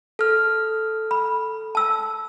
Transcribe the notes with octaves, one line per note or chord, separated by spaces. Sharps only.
A4 F6
B5
A5 E6